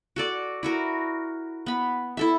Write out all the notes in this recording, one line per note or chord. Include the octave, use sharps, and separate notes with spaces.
F#4 A4 D5
E4 F#4 A#4
B3 B5
E4 A4 E5